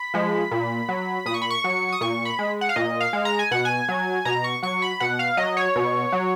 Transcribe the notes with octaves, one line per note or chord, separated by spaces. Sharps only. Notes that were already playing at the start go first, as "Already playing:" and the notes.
Already playing: B5
F3 G#3
A#2
F#3
A#2 D#6
C#6
B5
C#6
F#3
D#6
A#2 C#6
B5
G#3
F#5
F5
A#2 D#5
F5
G#3
A#5
G#5
B2 F#5
G#5
F#3
B2 A#5
C#6
F#3 C#6
B5
B2 F#5
F5
F#3 D#5
C#5
B2
F#3